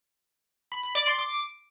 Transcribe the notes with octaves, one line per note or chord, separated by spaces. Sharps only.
B5
B5
D5
C6
D6